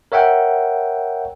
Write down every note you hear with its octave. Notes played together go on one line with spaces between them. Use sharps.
A#4 C#5 E5 F#5 G5